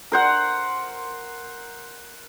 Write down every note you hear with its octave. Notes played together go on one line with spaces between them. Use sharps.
A#4 C5 F#5